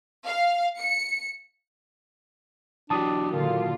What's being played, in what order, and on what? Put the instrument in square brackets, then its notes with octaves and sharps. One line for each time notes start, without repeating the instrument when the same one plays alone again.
[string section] F5
C#7
[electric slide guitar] E3 F#3 G4 [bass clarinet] D4 [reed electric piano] A5 D#6
[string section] A#2 D3 F4 [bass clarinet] D#3